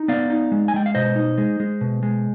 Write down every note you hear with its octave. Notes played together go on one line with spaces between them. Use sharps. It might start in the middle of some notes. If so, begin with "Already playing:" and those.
Already playing: D#4
B3 D5 F5
D#4
G#3
G#5
G#3 G5
F5
B2 C5 D#5
D#4
G#3
G#3
B2
G#3